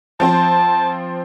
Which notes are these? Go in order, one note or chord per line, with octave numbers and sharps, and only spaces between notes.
F3 C4 C5 A5